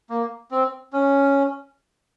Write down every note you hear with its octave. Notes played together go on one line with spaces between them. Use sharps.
A#3
C4
C#4